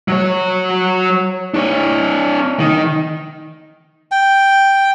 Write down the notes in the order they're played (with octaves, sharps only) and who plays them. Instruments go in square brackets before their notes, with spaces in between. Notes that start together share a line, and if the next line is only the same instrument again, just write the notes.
[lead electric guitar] F#3 C#5
D4 C#5
D#3
[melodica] G5